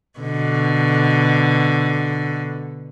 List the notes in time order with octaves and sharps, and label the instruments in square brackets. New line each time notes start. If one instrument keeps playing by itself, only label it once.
[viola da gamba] B2 D3